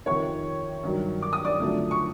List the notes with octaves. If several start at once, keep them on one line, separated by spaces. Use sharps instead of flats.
F2 C3 D#3 C#5 C#6
G2 D#3 F#3
D6
D#6
D5 D6
F2 D3 F#3 A3
C#6